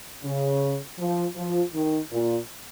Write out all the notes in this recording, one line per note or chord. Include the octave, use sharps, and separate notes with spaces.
C#3
F3
F3
D#3
A#2